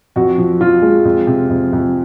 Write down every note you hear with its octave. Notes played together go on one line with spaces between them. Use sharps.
F2 F#4
F3
F3 F4
G#3
F2
C3
F2
F2